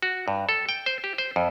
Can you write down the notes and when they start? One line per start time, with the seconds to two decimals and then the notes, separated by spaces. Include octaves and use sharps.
0.03 F#4
0.28 G2
0.49 A4
0.69 G5
0.86 C5
1.04 G4
1.18 C5
1.36 F2